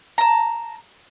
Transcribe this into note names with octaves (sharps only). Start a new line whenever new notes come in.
A5 A#5